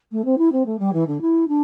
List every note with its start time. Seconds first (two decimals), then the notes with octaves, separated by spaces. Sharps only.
0.11 A3
0.24 C4
0.37 E4
0.52 C4
0.65 A3
0.79 G3
0.92 E3
1.07 D3
1.21 E4
1.47 D4